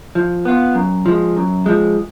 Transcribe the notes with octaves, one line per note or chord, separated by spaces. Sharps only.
F3
B3 F4
F#2
F3 G#3
F#2
F3 G#3